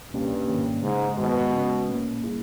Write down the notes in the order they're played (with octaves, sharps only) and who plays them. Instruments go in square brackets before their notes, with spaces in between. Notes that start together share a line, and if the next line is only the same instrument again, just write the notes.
[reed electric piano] C#2 B2 A#3 C#4 G4 [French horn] G2
[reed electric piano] G#2 D#3 A#3 C#4
[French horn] G#2 [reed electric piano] C#3 G#3 D#4
[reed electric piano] G2 D#3 G#3 B3 [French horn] B2
[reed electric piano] C#3 G#3 C#4
A#2 A#3 C#4
G3 A#3 E4 G#4